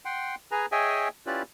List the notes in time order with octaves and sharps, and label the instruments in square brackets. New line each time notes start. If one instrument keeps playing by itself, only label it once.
[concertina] F#5 G5 C6
G#4 B4 G#5 A#5
G#4 C#5 D#5 E5 G5 G#5
C#4 E4 F4 G4 B4 D5